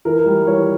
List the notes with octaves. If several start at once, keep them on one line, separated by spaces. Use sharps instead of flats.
E3 A#4
G3
E3 C#5